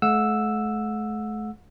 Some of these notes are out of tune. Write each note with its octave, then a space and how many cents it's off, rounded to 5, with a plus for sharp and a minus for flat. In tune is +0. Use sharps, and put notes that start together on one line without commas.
A3 -40 F#5 -30 E6 +0